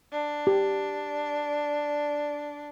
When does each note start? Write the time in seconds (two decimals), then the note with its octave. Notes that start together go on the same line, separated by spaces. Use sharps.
0.13 D4
0.47 G4